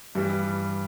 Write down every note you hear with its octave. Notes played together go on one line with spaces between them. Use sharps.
G2 E3 G3